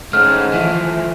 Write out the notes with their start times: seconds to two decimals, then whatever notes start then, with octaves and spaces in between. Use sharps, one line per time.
0.13 G#2 A3 C#4 F6
0.54 E3 F3 A3